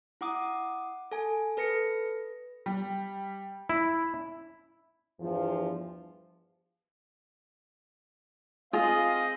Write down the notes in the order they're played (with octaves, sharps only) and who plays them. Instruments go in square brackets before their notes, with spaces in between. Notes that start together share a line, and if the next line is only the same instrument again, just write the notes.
[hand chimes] E4 F#5 D6 D#6
A4 G#5
A4 B4 A#6 C#7
[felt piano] G3
[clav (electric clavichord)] E4
[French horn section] E2 G2 F3
[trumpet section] C4 D#5 [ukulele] F4 [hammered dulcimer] G#4 [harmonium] F5